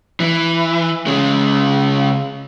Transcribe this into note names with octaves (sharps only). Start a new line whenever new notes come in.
E3
C#3 G#3